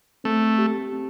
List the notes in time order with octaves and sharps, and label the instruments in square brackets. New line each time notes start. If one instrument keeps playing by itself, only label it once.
[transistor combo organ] A3 [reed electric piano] C4
[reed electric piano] G4
C4